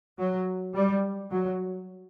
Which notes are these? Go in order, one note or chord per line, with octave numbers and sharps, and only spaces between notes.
F#3
G3
F#3